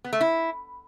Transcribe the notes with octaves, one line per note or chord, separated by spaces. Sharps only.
B3
A3
E4